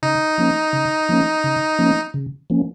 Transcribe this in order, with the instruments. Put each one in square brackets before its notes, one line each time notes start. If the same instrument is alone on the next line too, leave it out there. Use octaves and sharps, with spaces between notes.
[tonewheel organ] C#3 [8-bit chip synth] D#4
[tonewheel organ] F3 A#3 C#4
C#3
F3 A#3 C#4
C#3
F3 A#3 C#4
C#3
F3 A#3 C#4